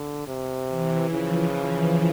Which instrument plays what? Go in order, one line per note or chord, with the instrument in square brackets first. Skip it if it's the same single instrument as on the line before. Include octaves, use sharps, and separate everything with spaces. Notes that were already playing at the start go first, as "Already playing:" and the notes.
Already playing: [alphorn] D3
C3
[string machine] E3
[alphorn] C#3 [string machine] F3